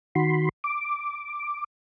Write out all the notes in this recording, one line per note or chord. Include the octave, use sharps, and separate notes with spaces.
D#3 F#4 B5 C6
D6